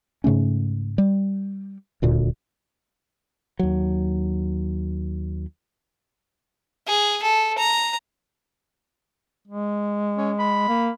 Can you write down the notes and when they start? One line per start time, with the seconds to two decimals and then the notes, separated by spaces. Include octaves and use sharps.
0.24 G#2 C#3 A3 C#4
0.98 G3
2.02 D#1 D2 A#2
3.59 D#2 F#3
6.87 G#4
7.22 A4
7.58 A#5
9.48 G#3
10.17 C#4
10.39 B5
10.68 A#3